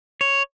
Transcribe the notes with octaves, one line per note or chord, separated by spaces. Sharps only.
C#5